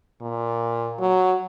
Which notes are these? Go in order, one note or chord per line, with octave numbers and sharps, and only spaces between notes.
A#2
F#3